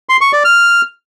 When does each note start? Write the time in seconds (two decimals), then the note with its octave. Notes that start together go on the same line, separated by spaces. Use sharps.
0.09 C6
0.21 C#6
0.33 D5
0.45 F6